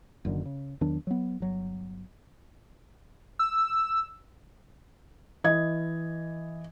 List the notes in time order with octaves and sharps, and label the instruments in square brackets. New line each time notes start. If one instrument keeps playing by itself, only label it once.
[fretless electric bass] F#1 F#2 D3 D#3
C#3
E2 D#3 F#3 D4
F#3 B3
G1 F#3
[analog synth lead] E6
[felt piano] E3 D#5 G#6